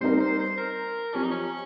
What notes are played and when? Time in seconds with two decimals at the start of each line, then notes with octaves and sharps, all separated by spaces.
0.01 G3 C4 D#4 A#4 C5
0.20 C5
0.39 C5
0.57 A#4
1.14 F3 C4 C#4 G4
1.23 D#4
1.31 C#4